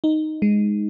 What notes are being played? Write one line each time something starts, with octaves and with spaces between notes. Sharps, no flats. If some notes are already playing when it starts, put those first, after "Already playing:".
D#4
G#3